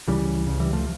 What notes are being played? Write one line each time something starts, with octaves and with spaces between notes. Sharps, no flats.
C#2 C#3 E3 G3
C#2 C#3
E3 G3
F3 A3